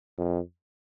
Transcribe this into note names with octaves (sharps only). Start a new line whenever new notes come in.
F2